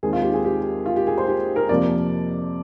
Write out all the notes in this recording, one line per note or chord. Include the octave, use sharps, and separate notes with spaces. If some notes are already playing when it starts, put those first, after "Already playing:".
D#2 D#3 G#3 C4 G#4
F4
G4
G#4
G4
F4
G4
G#4
C5
G4
A#4
F2 C3 F3 A#3 D5